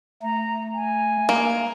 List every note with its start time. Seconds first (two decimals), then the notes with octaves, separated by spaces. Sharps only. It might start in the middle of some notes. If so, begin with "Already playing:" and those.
0.22 A3 A#5
0.74 G#5
1.29 A#3